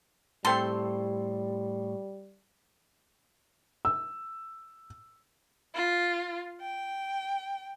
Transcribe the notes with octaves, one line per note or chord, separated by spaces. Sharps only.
A2 G3 A3 C4 A4 C6
E6
F4
G5